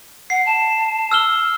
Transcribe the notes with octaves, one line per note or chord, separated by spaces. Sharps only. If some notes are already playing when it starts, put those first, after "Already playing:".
F#5 C7
A5
E6 F6 G7